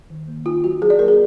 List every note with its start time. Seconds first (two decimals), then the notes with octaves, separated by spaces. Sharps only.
0.10 D#3
0.28 A#3
0.46 D#4 F4
0.64 F#3 F#4
0.82 F#3 G#4
0.90 D5
0.99 A#3 A#4
1.08 G#4